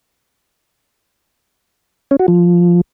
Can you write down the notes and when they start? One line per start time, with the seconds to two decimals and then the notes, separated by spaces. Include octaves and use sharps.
2.11 C#4
2.20 F#4
2.28 F3